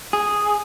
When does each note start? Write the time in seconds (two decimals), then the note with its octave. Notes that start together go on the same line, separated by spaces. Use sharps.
0.13 G#4